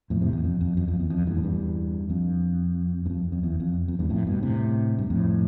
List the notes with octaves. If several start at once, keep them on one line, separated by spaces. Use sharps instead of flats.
F2 A2
A2 C3
E2
F2
F2
F2
F2
E2
F2
E2 G2
A2
E2 G2
F2
G2
F2
F2
E2
F2
F2
E2 G2
F2 A2
G2 B2
A2 C3
G2
F2 A2